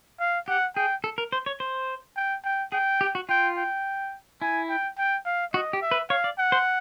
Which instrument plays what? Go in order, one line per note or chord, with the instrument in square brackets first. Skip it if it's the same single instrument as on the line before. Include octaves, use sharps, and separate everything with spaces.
[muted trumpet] F5
[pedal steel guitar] G4 [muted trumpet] F#5
[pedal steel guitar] G#4 [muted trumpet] G5
[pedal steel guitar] A4
A#4
C5
C#5
C5
[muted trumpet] G5
G5
[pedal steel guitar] G#4 [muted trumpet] G5
[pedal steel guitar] G4
F#4
[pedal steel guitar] F4 [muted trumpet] G5
[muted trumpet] G5
[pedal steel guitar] E4 [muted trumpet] G#5
[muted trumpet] G5
G5
F5
[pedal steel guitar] F#4 [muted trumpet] D#5
[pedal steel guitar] G4
[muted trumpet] E5
[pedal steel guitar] B4
[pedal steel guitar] C#5 [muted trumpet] F5
[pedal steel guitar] D5
[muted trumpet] F#5
[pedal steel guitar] C5